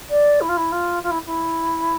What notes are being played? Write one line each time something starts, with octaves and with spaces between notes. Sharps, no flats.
D5
E4
F4
E4
F4
F4
E4
E4